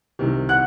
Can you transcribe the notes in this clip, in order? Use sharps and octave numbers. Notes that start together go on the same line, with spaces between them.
C2 C3 D#3
F#5 F#6